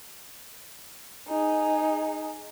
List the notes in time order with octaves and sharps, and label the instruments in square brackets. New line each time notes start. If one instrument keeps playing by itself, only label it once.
[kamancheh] D#4 G#4